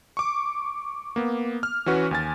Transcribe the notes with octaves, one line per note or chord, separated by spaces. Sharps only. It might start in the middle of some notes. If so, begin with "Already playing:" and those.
C#6 D6
A#3 B3
F6
E3 C#4 F#4 B4
D#2 G#5 A6